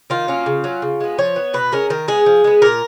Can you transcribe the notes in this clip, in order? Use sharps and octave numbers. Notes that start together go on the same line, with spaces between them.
D#3 F4
F#3 A#3 C#4
C#3
F#3 C#4
C#3
G#3 B3
F3 C#5
B3
B2 B4
G#3 C#4 A#4
D#3 A#4
G#3 B3 G#4
F3
G#3 B3
A#2 A#4